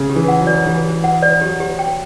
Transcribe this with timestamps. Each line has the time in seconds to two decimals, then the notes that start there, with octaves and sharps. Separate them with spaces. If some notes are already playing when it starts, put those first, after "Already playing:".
Already playing: C#3
0.10 G4
0.16 E3
0.28 F#5
0.41 F#3
0.47 D5
0.66 E3 G4
0.85 G4
1.04 F#5
1.22 D5
1.41 F#3 G4
1.60 G4
1.79 G5